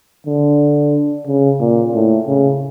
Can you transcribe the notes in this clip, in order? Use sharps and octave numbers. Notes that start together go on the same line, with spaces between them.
D3
C#3
A#2
A2
C#3